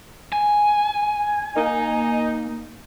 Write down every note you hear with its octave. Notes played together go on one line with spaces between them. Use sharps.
G#5
A#3 D#4